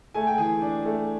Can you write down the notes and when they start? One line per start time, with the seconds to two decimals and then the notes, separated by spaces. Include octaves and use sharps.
0.14 A3 G#5
0.27 G5
0.38 E3 G#4 G#5
0.62 D4
0.85 A3